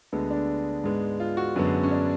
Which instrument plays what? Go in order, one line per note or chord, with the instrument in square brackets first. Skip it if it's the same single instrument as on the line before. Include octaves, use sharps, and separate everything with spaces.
[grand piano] D2 D3 G#3 B3
D4
G#2 G#3 B3
F4
F#4
F#2 D3 G#3 B3
C#4
D4